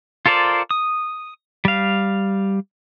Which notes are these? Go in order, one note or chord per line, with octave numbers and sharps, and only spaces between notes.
F4 A4 A#4 C5 D5
D#6
G3 F5